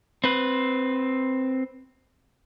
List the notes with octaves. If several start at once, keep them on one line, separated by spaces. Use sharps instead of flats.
C4 B4